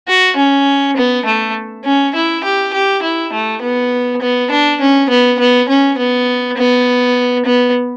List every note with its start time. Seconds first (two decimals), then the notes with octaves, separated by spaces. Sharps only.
0.08 F#4
0.37 C#4
0.97 B3
1.26 A3
1.85 C#4
2.15 E4
2.44 G4
2.74 G4
3.03 E4
3.33 A3
3.62 B3
4.22 B3
4.51 D4
4.81 C#4
5.09 B3
5.39 B3
5.69 C#4
5.98 B3
6.57 B3
7.46 B3